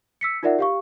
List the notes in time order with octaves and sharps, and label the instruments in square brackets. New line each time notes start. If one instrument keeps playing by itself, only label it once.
[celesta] E6 B6 C#7
D#4 F4 A#4 D5 E5 F#5
G4 F5 C#6